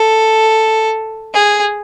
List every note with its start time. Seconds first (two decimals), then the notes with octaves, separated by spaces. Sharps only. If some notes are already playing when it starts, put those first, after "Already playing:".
Already playing: A4
1.34 G#4